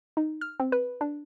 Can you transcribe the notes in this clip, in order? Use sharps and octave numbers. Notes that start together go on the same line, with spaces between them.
D#4
F6
C4
B4
D4